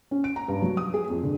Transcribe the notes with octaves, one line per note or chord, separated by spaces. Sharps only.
C#4
D7
A#5
G2
F#3
D#6
G#4
F2
D3